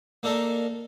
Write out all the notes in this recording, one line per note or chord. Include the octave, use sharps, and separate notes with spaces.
A#3 D4 D#4 A4 A#4